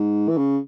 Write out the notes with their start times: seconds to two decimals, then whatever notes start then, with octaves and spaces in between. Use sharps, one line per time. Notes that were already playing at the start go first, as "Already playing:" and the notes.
Already playing: G#2
0.29 E3
0.37 C#3